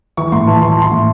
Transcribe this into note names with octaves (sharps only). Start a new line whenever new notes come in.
E3 C#6
A2 C6
E3 A5
E3 C6
A5
E3 C6
A2